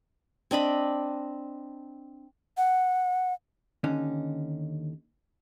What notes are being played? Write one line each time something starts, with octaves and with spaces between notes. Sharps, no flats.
C4 D4 D#5 B5
F#5
D#2 D3 C#4 D#4